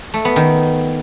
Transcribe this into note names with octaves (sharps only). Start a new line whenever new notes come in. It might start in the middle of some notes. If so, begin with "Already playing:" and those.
A3
B3
D#3